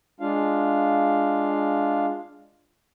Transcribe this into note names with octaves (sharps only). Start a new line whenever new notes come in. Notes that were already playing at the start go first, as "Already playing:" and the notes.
G#3 D4 F4 F5